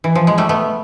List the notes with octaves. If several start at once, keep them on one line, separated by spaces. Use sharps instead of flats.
E3
F3
G#3
G3 A3
A3 B3